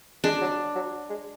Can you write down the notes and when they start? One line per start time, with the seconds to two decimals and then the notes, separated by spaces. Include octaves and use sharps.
0.24 G#3 D4
0.41 F#3
0.75 F#3
1.10 G#3